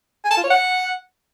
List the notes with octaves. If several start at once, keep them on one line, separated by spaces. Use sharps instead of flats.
G#5
A5
F4
C#5
F#5